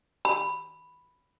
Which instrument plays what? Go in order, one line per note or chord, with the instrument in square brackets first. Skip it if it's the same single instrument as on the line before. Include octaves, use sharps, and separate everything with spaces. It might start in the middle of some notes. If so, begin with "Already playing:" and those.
[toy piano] B5